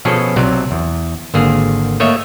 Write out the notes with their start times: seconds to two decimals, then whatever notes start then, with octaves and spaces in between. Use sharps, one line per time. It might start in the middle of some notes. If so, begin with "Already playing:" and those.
0.05 B2 F3 C#4 G#4 A4
0.36 B1 C3 F#3 D5
0.71 E2
1.34 G#1 D3 A#3 G#4
2.00 A3 A#3 C#5 D#5 E5